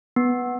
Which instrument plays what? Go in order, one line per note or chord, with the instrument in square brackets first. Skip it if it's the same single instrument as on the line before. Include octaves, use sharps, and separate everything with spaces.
[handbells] B3